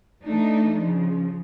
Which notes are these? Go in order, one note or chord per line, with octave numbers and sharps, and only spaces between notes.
E3 A3 D4 D#4
C#3 F3